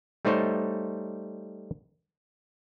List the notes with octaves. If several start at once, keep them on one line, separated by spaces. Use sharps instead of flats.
G3 A3 D#4 C5 C#5